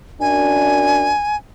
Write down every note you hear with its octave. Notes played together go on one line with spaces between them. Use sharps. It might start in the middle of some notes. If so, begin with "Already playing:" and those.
F#2 D4 G#5